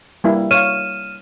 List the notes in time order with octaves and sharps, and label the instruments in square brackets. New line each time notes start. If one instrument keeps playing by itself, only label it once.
[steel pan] G3 A#3 E4
[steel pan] C#5 F5 [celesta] F6 D#7 E7